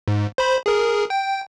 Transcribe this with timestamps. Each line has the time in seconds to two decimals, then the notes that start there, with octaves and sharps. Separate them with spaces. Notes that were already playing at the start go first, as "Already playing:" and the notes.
0.08 G#2
0.38 C5 B5
0.66 G#4 A#4
1.10 G5